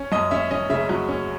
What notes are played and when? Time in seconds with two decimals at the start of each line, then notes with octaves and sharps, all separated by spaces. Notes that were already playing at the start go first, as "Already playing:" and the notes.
Already playing: C#4
0.12 F#2 D#5
0.31 C#4 E5
0.51 C#4 D#5
0.70 C#3 E5
0.89 F#3
1.09 C#4